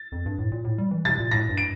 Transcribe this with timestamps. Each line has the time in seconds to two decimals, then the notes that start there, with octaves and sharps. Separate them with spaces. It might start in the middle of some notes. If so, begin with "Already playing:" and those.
Already playing: A6
0.12 F2
0.26 G2
0.38 A2
0.52 A#2
0.64 A2
0.78 G3
0.91 E3
1.05 C3 A6
1.18 A#2
1.31 A2 A#6
1.49 G2
1.57 D7